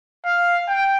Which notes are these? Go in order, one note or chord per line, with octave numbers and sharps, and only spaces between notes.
F5
G5